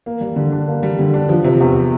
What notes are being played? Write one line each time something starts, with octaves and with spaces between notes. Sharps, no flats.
A#3
G3
D3
D4
A#3
G3
D3
D4
F3
C3
E2